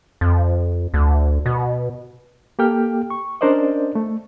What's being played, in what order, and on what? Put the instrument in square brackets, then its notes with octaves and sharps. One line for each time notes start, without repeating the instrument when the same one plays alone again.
[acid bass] F2
D2
B2
[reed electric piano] A#3 G4 A4 G5 F6
C#6
C#4 D4 A#4 C5 D5 D#5
A3